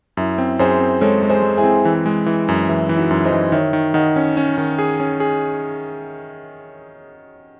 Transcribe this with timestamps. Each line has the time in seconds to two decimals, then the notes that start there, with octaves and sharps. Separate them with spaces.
0.17 F#2 E4
0.38 C4
0.59 F#2 G#4 C5
0.80 C4
1.01 G#3 A4 C#5
1.23 G#3
1.29 G#4 C5
1.43 G#3
1.57 E4 G#4
1.64 C4
1.85 E3
2.06 G#3
2.26 E3
2.48 F#2
2.69 E3 E4
2.89 E3
2.96 D#4 F#4
3.11 F#2
3.25 C5 D#5
3.32 E3
3.52 D#3 C#5 E5
3.73 D#3
3.94 D#3 D#5 F#5
4.16 C#4
4.37 C#4
4.58 D#3
4.79 G#4
5.00 C#4
5.20 G#4